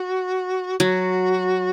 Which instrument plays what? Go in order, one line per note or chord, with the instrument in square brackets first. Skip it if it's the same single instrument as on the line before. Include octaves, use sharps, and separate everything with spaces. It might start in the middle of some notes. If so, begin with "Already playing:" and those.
Already playing: [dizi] F#4
[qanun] F#3 [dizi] F#4